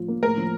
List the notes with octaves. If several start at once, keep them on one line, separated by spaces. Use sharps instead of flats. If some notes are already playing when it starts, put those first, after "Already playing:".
Already playing: A2 F3 F4
A#3
A2 A#4
F3